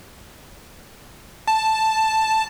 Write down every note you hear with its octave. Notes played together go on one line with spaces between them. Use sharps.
A5